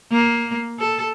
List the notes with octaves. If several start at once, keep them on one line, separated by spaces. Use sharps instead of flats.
A#3
A4